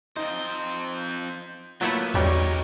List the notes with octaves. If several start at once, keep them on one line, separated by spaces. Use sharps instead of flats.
F2 D#4 C5
A#2 F#3 A3 B3 E4
B1 E2 F#3 G3 C#4 D#4 C#5